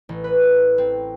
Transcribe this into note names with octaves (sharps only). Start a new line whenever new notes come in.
A1
B4
C4